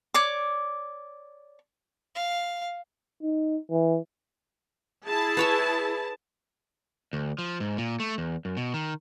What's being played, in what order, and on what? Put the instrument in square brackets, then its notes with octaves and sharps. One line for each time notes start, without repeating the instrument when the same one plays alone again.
[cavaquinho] C#5 D5 D6
[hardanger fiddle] F5
[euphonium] D#4
E3
[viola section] E4 G#4 A5
[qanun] B4 C#5 E5
[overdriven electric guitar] D2
F3
G#2
A#2
A3
E2
F#2
B2
D#3